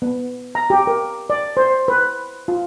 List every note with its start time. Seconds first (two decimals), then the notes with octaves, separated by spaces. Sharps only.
0.02 B3
0.55 A#5
0.70 G4
0.87 A#4
1.30 D5
1.57 C5
1.88 B4
2.48 F4